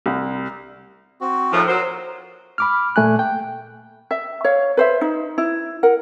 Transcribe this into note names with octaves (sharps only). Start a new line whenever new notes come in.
C2
C4 F#4
D#2 A2 F3
F#3 A#4 C5
B5 D6 F6
A#2 A3 G#5 F#6
G5
E5
C#5 F5
B4 C5 E5
D#4
E4
A#4 F#5